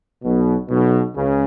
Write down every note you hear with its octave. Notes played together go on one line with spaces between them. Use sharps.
B1 B2
B1 B2
C#2 C#3